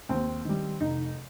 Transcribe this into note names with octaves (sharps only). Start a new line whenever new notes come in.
D#2 C4
D#3 G3
F1 D#4